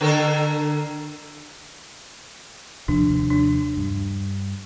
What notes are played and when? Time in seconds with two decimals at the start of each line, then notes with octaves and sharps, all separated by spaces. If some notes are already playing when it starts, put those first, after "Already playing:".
0.01 D3 A4 A#4
2.88 D#2 C3 F3 D4
3.31 D4
3.77 G2